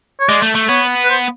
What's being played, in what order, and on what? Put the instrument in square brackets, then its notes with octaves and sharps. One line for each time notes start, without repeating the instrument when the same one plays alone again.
[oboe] C#5
[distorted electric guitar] G#3 [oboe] D5
[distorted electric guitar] A3
A3
[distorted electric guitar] B3 [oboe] C#5
[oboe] B4
C5